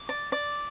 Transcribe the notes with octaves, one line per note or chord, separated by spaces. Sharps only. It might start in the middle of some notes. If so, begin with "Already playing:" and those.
Already playing: D6
D5
D5